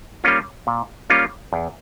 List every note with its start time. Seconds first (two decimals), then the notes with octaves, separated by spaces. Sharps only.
0.24 G3 A#3 C#4 F4
0.67 A#2
1.10 G3 A#3 C#4 F4
1.53 E2